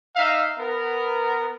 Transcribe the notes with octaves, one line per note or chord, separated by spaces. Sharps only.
D#4 E5 F5
B3 A#4